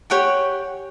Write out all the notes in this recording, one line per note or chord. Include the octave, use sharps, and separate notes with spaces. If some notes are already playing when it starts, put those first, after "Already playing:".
G4 C#5 F#5 G#5